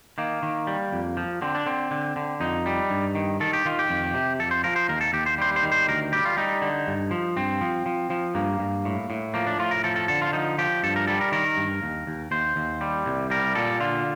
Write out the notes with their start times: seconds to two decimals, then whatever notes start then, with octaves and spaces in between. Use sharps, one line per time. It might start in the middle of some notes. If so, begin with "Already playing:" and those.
0.18 D#3 A#3
0.43 D#3
0.67 G3
0.93 F2
1.17 F3
1.42 D3 C4
1.55 D4
1.66 D3 C4
1.91 D3
2.16 D3
2.40 F2 D#4
2.66 G3
2.90 G2
3.15 D#3
3.40 D#3 A4
3.53 G4
3.65 D#3 F4
3.79 G4
3.89 F2
4.14 C3
4.39 F2 A4
4.51 C5
4.64 F3 A#4
4.76 C5
4.89 D#2 A#4
5.01 A4
5.13 D#2 G4
5.26 C5
5.38 G3 C5
5.56 C5
5.63 D#3
5.72 C5
5.88 D2 A#4
6.13 G3 G4
6.25 F4
6.37 G3 D#4
6.62 D3
6.87 G2
7.11 F3
7.36 G2 C4
7.61 F3
7.86 F3
8.10 F3
8.35 G2 A#3
8.59 G2
8.85 A2
9.10 A2
9.34 F3 A#3
9.47 D4
9.59 A2 F4
9.71 A#4
9.84 F3 A4
9.96 A4
10.08 D3 A4
10.22 F4
10.33 F3 D#4
10.59 F3 G4
10.83 G2 A4
10.96 A#4
11.07 G3 A4
11.21 A#4
11.32 D#3 A#4
11.57 G2
11.83 D#2
12.07 D#2
12.31 D#2 C5
12.56 D#2
12.81 G3
13.06 C2
13.30 G3 A#4
13.55 A#2 A4
13.80 D3 F4